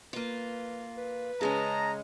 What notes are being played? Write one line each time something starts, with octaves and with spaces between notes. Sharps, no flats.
A#3 F4 B4
B4
C#3 G#3 C#4 G#4 D#5 A5 A#5